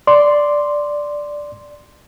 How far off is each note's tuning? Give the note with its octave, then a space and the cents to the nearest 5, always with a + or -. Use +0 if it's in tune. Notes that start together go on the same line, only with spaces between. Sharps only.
D5 +0 C6 +0